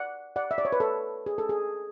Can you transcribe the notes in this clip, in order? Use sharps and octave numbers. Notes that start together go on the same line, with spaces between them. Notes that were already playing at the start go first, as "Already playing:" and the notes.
Already playing: D5 F#5
D5 F#5
E5
D5
C#5
B4
A4
G#4
A4
G#4